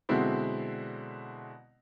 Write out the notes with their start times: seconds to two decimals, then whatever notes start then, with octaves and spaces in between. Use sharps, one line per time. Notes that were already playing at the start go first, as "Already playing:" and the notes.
0.09 B2 D3 F#3 G#3 C4 E4